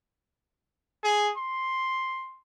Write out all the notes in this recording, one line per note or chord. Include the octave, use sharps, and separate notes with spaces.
G#4
C6